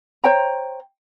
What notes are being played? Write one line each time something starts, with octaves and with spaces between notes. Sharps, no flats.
C5 C#5 G5 A#5